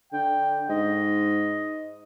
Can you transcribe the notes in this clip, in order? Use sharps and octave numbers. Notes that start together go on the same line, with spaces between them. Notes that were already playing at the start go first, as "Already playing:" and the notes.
D3 G5
G#2 D#5